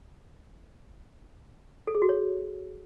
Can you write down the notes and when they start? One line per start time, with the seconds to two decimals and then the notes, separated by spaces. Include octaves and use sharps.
1.87 A4
1.95 G#4
2.02 F#4
2.09 C#5